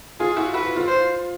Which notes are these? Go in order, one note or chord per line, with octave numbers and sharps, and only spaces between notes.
F4 G#4
E4 F#4
E4 F#4 B4
F4
C5